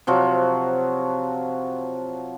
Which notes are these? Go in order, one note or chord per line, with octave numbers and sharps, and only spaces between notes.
C3 F3 F#3